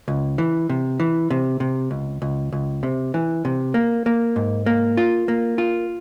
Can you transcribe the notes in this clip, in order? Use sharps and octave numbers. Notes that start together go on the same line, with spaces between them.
C#2
E3
C3
E3
C3
C3
C#2
C#2
C#2
C3
E3
C3
A#3
A#3
G#2
A#3
F4
A#3
F4